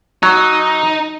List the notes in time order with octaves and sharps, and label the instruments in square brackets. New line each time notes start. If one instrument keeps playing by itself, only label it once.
[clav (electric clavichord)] F#3 [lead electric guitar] D#4